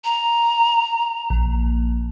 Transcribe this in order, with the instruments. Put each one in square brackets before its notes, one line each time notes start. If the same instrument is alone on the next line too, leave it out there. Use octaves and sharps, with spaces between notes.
[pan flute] A#5
[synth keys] A#1